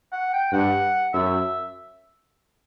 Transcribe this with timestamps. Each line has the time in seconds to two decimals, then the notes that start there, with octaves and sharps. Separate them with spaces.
0.12 F#5
0.33 G5
0.53 G2 F#5
1.14 F#2 E5